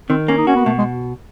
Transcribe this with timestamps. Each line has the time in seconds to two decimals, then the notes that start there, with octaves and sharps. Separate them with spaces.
0.10 D#3 C4
0.28 A#3 C#4
0.38 D#4
0.47 C#4 F#4
0.56 B3
0.66 B2 A3
0.78 G#3